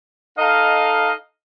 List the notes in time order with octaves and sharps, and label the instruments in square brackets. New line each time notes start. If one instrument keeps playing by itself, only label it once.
[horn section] D#4 A4 D#5 F5